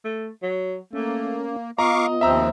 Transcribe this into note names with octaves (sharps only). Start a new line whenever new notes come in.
A3
F#3
A3 A#3 C#4
B3 F4 D#5 F5 A#5 C#6 D6
D#2 F3 C4 E5 A#5 E6